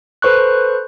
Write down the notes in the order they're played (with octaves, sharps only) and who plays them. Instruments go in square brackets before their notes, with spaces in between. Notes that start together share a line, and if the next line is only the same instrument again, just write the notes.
[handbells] A4 B4 C5 C#6 F#6